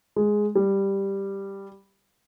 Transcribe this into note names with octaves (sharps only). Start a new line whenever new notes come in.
G#3
G3